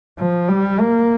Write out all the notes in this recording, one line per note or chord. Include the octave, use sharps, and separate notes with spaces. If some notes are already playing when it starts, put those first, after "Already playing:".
F3
G3
A#3